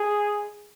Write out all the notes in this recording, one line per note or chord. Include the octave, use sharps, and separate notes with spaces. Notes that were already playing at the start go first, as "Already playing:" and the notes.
Already playing: G#4